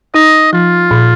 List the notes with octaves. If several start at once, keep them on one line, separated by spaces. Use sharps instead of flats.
D#4 D#5
F3 F4
A#2